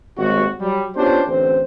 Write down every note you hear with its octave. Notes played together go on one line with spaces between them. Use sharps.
G#1 D#2 G3 F#4
F#3 G3
B3 C#4 D4 F4 G4 C5
A1 D3 C4 C5